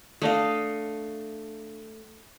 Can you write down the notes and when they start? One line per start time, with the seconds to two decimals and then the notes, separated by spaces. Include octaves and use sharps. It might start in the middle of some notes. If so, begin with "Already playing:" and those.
0.22 A3 D4 D#5 F5